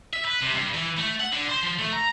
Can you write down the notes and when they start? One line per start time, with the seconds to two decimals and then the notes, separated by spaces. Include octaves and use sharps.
0.13 E5
0.25 B4
0.42 C3
0.54 G2
0.74 E3
0.97 A3
1.20 F#5
1.32 D3
1.49 C5
1.63 F3
1.79 A3
1.93 A#5